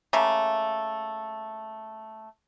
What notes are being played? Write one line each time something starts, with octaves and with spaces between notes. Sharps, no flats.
C#3 A3 A#3